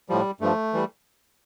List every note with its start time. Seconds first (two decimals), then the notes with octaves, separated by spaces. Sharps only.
0.09 A2 F3 G3
0.41 G2 F3 A3
0.73 E3 G3